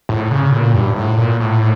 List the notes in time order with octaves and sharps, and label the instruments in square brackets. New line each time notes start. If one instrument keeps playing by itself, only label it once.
[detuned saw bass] A2
C#3
A#2
G2
A2
A#2
A2